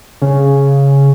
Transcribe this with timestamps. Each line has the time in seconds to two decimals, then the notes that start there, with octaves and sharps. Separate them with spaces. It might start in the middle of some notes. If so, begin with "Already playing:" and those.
0.22 C#3